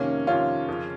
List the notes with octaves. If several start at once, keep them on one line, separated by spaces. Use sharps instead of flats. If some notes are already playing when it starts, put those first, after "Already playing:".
Already playing: F2 C3 D#3 A#3 C#4
F2 C3 D#3 C#4 F4
F2 C#3